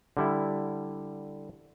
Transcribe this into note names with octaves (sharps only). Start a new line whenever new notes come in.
D3 G3 E4